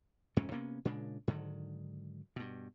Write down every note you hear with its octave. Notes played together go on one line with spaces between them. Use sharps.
F2 G#2 C3 C#4
C3 A#3 B3 C#4
A#2 C#3 G#3 D4
G#2 D3 D#3 F#3
G2 B2